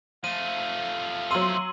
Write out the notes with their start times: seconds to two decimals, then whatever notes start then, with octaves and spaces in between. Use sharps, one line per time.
0.24 F3 A3 F5 D#7
1.31 F#3 C6 E6 D#7 F#7